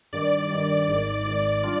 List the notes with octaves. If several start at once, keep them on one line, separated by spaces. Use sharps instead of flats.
G2 D#3 G3 D5
G2 D#3 G3
G#1 G#2 D#3
G#1 G#2 D#3 D5
G3 D4 F4